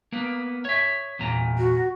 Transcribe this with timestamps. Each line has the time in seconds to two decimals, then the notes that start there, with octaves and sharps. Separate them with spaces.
0.12 A#3 B3
0.65 C#5 E5
1.19 E2 A#2 A#5
1.58 F#4